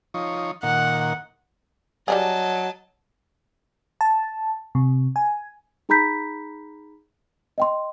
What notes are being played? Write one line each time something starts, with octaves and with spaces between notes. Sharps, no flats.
F3 D#4 C#5
A#2 D#3 F#5
F#3 G3 D4 G#4 D#5 A5
A5
C3
G#5
D#4 G#4 A#5 B5 G6 B6
D#5 G5 C6